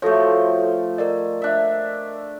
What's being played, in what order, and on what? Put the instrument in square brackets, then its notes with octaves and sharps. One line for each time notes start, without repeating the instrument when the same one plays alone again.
[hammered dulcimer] F3 A3 [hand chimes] F#4 A4 C#5
[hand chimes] A#4 D5 D#5
[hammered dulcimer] D4 E5